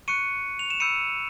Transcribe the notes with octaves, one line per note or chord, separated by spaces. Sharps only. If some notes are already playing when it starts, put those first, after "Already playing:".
C#6 F#6 C#7 D#7
F7
E7
B5 E6 G6 C#7 D#7